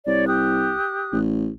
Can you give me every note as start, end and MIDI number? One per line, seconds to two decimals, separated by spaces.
0.07 0.74 36
0.07 0.25 73
0.07 0.25 74
0.27 1.19 67
0.27 1.19 87
0.27 1.19 90
1.13 1.50 33